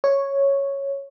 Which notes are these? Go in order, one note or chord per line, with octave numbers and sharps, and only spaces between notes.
C#5